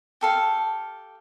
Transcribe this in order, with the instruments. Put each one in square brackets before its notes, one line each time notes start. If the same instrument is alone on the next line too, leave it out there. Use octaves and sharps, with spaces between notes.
[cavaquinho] G4 A4 F5